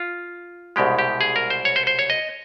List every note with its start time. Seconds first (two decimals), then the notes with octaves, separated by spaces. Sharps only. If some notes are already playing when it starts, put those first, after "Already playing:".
Already playing: F4
0.76 C2 B2 G#3 G4
0.99 G4
1.21 G#4
1.36 A#4
1.50 C5
1.65 C#5
1.76 C5
1.87 C5
1.99 C#5
2.10 D#5